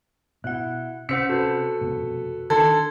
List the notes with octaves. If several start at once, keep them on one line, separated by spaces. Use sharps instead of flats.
B2 E4 F#5 F#6
C3 C#4 C5 F#5 E6 B6 C#7
F#4 A4 B4
F1 B2
D#3 D4 A4 C6 G#6